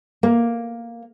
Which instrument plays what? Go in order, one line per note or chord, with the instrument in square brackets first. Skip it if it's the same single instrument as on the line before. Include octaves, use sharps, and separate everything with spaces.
[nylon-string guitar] A#3